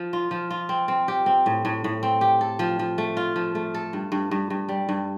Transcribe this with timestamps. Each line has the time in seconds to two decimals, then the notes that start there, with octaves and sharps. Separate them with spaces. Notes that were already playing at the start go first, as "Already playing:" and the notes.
Already playing: F3
0.13 F4
0.31 F3
0.51 F4
0.69 C4
0.88 C4
1.08 G4
1.26 C4
1.46 A2
1.65 A2
1.84 A2
2.03 C4
2.21 G4
2.41 A4
2.59 F3
2.79 F3
2.98 A3
3.17 F4
3.36 F3
3.55 A3
3.74 A4
3.93 G2
4.12 G2
4.31 G2
4.50 G2
4.69 G3
4.89 G2